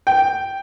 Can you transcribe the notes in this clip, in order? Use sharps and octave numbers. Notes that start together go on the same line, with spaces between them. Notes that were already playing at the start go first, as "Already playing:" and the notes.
G5